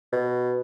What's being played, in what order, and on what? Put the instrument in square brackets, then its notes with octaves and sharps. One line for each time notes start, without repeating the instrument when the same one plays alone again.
[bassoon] B2